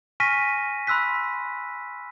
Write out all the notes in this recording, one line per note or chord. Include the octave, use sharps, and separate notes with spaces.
G#5 C#6 F6 A#6 B6 D#7
B5 C6 E6 F#6 B6